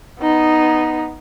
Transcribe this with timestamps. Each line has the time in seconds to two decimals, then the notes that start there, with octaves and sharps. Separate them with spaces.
0.20 B3 D#4